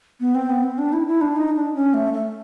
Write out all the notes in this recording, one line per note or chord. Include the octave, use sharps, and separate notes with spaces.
B3
C4
B3
C4
D4
E4
E4
D4
D#4
D4
C#4
A3
A3